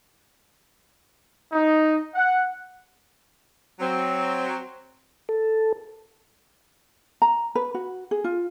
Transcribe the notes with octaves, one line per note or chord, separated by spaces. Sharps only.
D#4
F#5
F#3 C4
A4
A#5
B4
F#4
G#4
F4